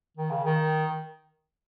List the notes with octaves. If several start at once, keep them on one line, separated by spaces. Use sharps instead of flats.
D#3
C#3
D#3